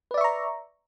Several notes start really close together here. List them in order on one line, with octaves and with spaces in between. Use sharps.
B4 D5 E5 C#6 A#5